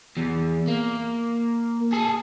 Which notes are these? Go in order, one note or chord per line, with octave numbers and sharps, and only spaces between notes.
E2
A#3
G#4 A4